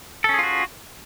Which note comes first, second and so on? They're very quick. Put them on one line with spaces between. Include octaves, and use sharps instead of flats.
A4 C#4 G#4 F4 F#4